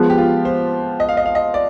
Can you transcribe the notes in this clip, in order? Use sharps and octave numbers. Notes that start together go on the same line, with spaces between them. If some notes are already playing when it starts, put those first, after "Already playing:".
Already playing: F3 G#3 B3
G4
F4
C5
D#5
F5
D#5
F5
D#5
D5